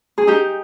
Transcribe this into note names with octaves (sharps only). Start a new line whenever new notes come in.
G#4
D#4 G4